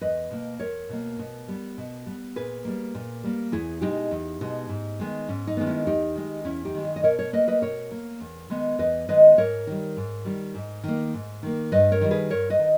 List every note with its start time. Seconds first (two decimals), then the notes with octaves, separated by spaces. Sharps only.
0.01 E2 B4 D#5
0.31 B2 A#3
0.60 E2 A#4 C#5
0.89 B2 A#3
1.19 B2
1.48 G3 B3
1.78 B2
2.06 G3 B3
2.36 A#2 G#4 B4
2.65 G3 A#3
2.95 A#2
3.23 G3 A#3
3.52 E2 E4 G#4
3.81 B2 G#3 D#4 G4
4.11 E2
4.41 B2 G#3
4.69 G#2
5.00 D#3 G#3 B3
5.28 G#2 C#4
5.47 D#4
5.57 D#3 G#3 B3
5.67 C#4 E4
5.87 E2 D#4 G4
6.16 D#3 G#3
6.44 E2 C#4 E4
6.65 D#4 G4
6.74 D#3 G#3
6.85 D#4
6.96 D#5
7.03 B2 A#4 C#5
7.19 A#4 C#5
7.33 A#3 B4 D#5
7.48 B4 D#5
7.62 B2 A#4 C#5
7.91 A#3
8.21 E2
8.50 D#3 G#3 B3
8.79 E2 B4 D#5
9.09 D#3 G#3 B3 B4 D#5
9.37 G#2 A#4 C#5
9.67 D#3 G3
9.97 G#2
10.25 D#3 G3
10.55 G#2
10.84 D#3 A#3
11.14 G#2
11.43 D#3 A#3
11.72 G2 B4 D#5
11.92 A#4 C#5
12.01 D#3 G3
12.11 G#4 B4
12.30 G2 A#4 C#5
12.50 B4 D#5
12.59 D#3